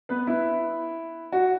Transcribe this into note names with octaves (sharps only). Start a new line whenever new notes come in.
B3 B4
E4
F#4